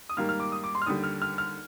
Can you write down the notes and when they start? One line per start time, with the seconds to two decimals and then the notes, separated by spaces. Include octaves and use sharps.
0.09 D#6
0.17 G#2 D#3 G3 A#3 F6
0.29 F6
0.40 D6
0.52 D#6
0.64 D6
0.75 C6
0.82 F6
0.86 D#2 D3 G3 D#6
1.04 F6
1.22 F6
1.38 F6